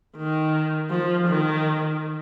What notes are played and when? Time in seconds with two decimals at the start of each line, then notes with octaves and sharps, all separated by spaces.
0.17 D#3
0.91 F3
1.27 D#3